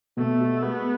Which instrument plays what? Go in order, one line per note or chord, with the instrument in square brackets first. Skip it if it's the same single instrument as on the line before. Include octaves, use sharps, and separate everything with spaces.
[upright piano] B2 [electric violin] A3
[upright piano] F#4
[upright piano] G#3 [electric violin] B3